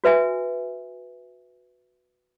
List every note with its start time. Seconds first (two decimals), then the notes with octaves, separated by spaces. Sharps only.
0.04 F#4 B4 E5 G#5